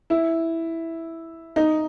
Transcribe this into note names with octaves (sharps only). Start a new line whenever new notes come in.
E4
D#4